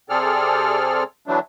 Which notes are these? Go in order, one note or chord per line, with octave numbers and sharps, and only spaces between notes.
C3 C4 G#4 A4 D5 F6
D3 E3 F#3 A3 D4